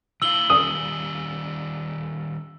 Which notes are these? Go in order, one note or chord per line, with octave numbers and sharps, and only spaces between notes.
D3 E4 F5 E6 F#7 G7
D#3 G3 C#4 D#6